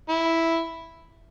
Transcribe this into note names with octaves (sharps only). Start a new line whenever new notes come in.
E4